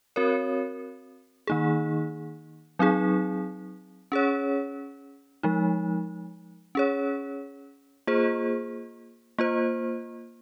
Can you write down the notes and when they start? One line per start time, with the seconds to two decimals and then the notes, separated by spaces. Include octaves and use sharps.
0.16 C4 F#4 A#4 C#5
1.47 D#3 A#3 D#4 G#4
2.79 F#3 C4 D#4 G#4
4.12 C#4 G#4 C#5
5.43 F3 G#3 D#4
6.75 C#4 G#4 C#5
8.07 A#3 F4 G#4 C5
9.38 A#3 F4 C5